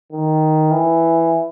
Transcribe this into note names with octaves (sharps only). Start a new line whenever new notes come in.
D#3
E3